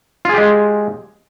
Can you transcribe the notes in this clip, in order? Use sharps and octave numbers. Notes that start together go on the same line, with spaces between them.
G#3 F4 G4 G#4